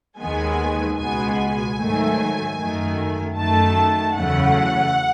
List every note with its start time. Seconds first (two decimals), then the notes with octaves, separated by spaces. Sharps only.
0.19 D#2 D#3 G#3 B3 G#5
0.98 C#2 B2 G#3 B3 G#5
1.38 G#5
1.78 G#2 D#3 F#3 A3
2.57 F#2 D#3 A3
3.36 F#2 D#3 A3 A5
4.16 E2 C#3 F#3 A3 F#5